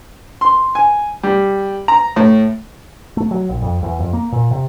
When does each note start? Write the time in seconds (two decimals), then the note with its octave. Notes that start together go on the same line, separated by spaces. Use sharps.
0.41 C6
0.75 G#5
1.23 G3
1.88 A#5
2.16 A2
3.17 A3
3.31 F#3
3.49 A#1
3.62 F2
3.83 E2
4.00 F2
4.13 A#3
4.32 A#2
4.51 C3